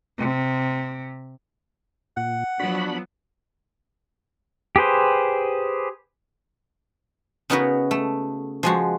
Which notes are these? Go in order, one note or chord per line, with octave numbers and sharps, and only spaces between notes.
C3
A#2 F#5
F3 F#3 B3 D4 F#4 B5
G4 G#4 B4 C5
C#3 B3 D#4 F#4 A#4 B4
A3
F3 G#3 F#4